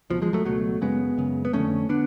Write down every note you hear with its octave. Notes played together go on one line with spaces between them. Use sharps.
C#2 B2 F3
F3 G#3
F#3 A3
C#2 B2 F#3 A3
F#2 C#3 G#3 B3
F#2 C#3
B3
F2 D3 A3 C#4
D3 B3 D4